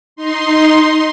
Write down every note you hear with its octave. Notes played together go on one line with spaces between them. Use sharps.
D#4 C6